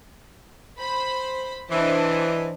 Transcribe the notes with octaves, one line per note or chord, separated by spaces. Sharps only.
C5 B5
E3 D4 C5 D#5